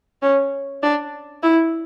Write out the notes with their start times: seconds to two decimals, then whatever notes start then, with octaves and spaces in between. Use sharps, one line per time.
0.22 C#4
0.83 D4
1.43 E4